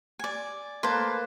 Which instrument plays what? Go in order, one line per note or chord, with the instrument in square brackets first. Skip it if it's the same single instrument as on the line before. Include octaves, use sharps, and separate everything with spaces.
[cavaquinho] D5 G#5
[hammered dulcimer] A#3 B4 [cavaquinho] C5 A5